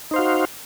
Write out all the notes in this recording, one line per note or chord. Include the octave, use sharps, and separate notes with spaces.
D#4 F#4 C5 F5